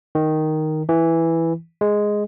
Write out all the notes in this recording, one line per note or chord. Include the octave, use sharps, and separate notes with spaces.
D#3
E3
G#3